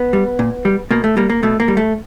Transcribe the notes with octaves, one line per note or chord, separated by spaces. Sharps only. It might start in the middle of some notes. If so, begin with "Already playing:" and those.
Already playing: B3
G3
A#2
G3
B2 A#3
A3
G3 A#3
A#3
B2 A3
A#3
G3
A3